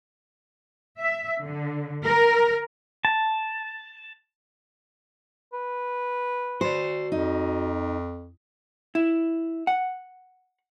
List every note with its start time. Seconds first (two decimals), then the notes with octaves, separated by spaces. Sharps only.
0.99 E5
1.43 D3
2.05 A#4
3.05 A5
5.53 B4
6.61 F#4 C5 D5
7.12 F2 D#4
8.95 E4
9.67 F#5